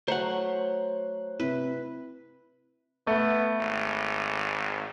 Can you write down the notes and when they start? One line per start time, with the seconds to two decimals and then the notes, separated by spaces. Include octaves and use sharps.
0.08 F#3 A3 C5 C#5 F#5 A#5
1.40 C3 E4 B4
3.07 A3 B3
3.60 G#1